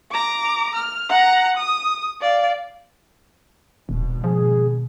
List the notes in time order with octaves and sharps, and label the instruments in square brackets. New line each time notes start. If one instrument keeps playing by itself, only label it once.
[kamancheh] A#5 D6
F6
F#5 A#5
D#6
D5 F5
[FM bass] D#1 [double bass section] G#1 B2
[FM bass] F3 [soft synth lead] G#4